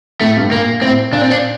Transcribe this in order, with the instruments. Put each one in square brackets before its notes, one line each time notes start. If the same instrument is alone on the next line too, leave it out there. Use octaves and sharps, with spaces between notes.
[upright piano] A2 [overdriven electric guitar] A3
[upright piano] G2
A2
[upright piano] A#2 [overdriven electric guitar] A#3
[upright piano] A2 [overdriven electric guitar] C4
[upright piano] A#2 [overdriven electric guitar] D4
[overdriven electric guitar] C4
D4